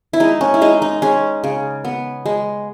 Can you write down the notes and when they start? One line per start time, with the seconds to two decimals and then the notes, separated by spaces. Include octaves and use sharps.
0.13 E4
0.20 G#3 D#4
0.41 C#4
0.54 E4
0.61 G#3 D#4
0.82 D#4
1.02 G#3 C#4
1.44 C#3
1.84 B3
2.26 G#3